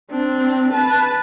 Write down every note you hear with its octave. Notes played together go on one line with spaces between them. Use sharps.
C4 D4
B4 A5